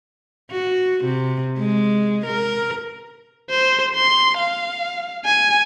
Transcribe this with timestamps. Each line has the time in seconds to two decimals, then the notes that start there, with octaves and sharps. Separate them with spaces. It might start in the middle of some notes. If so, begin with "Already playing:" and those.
0.51 F#4
1.05 C3
1.59 G#3
2.26 A#4
3.50 C5
3.96 C6
4.38 F5
5.25 G#5